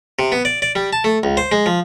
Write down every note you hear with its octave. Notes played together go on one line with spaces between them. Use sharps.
C3
B3
D5
D5
G3
A5
A3
C#2
C5
G#3
F3